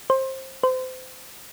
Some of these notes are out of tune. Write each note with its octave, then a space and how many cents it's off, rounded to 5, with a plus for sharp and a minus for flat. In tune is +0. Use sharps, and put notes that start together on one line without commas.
C5 +20
C5 -30